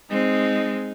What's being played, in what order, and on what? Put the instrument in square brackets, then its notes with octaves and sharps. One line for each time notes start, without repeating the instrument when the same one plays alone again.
[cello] G#3 C4 [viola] D#4